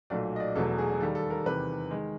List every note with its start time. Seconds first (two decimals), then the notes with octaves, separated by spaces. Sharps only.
0.10 B1 A#2 F#3 A3 D5
0.36 D#5
0.40 D5
0.55 E1 E2 B2 F#3 A3 A4
0.78 G#4
1.00 D#2 D#3 G3 A4
1.15 A4
1.30 A#4
1.46 E2 C3 D#3 B4
1.91 D#3 G#3